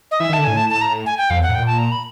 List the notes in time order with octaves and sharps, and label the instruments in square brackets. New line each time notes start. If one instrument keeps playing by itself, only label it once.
[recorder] D#5
[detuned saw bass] E3 [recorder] E5
[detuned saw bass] D#3
[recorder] A5
[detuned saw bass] D3
[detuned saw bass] A2 [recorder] G#5
[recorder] A5
A5
A#5
G#5
G5
[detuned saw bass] F2 [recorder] F5
[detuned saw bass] E2
[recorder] F#5
[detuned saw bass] A2
[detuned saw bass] A#2 [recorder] G5
[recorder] A5
A#5
B5